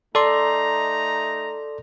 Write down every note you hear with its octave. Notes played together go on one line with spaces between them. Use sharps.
A3 D#4 A4 D5 A#5 C6